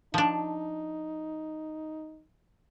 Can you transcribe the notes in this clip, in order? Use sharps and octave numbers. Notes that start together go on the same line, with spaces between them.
F3 D4 D#4